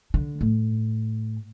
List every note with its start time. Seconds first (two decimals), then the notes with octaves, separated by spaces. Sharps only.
0.14 D3
0.41 A2